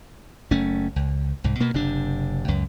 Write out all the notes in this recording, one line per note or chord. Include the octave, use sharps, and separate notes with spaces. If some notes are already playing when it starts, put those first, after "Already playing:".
F#1 A3 C#4
C#2
C2 G#2
B2 A#3 B3
F#1 C3 D4
C#2 F#2